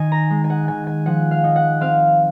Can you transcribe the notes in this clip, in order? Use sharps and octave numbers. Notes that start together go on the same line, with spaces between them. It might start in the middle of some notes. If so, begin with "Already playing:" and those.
Already playing: D#3 D#4 G#5
A#5
G#3
G#5
F#5
D#3 G#5
G#5
F3 F#5
F5
D#4
F#5
C4 F5